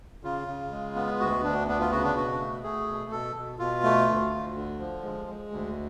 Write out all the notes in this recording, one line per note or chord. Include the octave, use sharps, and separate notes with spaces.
C#3 F4
C#3
G#3
B3
D2 F#4
D2 D4
B3 D4
F4
C#3 F#4
D4
B2 F#4
A3
A3 G#4
B2
B2 A4
B2
B2 F4
A3
D2
D2
D3
F3
G#3
G#3
D2